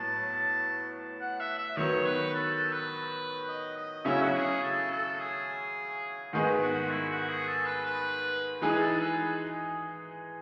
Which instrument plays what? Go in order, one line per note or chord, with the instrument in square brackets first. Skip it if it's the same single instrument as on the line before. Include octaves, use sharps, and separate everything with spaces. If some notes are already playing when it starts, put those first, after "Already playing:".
Already playing: [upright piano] A2 F#3 B3 [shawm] A5
[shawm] F#5
E5
E5
[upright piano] D#3 F#3 B3 [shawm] C#5
[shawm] B4
A4
A4
B4
D#5
D#5
[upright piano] C#3 F#3 C#4 E4 [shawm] E5
[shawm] F#4
G#4
A4
A4
G#4
[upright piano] G#2 D#3 G#3 B3
[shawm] F#4
E4
F#4
G#4
A4
B4
B4
[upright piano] E3 G#3 D#4 G#4 [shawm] B4
[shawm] A4
B4